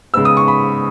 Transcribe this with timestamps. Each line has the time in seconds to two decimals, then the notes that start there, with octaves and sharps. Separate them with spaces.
0.14 C#3 G#3 B3 E6
0.25 D#6
0.37 C#6
0.48 B5